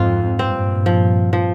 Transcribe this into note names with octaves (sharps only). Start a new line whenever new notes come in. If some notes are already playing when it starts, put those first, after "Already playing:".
Already playing: F2 G#2 C4 F4
G2 A#2 C4
F3
F3